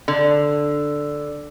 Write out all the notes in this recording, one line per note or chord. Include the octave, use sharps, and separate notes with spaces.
D3